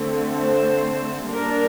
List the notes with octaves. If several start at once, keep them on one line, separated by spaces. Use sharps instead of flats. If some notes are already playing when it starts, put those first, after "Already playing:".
Already playing: D3 A3 C4
C5
G3 A#3 D4 A#4